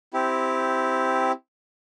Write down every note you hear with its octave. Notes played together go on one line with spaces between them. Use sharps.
C4 E4 G4